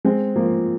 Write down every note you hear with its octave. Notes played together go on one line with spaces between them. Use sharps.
G#3 C4
F3 A#3